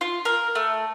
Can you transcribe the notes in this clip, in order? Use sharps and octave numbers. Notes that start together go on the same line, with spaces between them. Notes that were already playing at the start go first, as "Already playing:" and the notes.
F4
A#4
A3